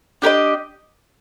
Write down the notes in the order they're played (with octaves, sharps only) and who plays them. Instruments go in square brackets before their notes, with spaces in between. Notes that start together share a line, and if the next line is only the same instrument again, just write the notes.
[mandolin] D4 G4 A#4 D#5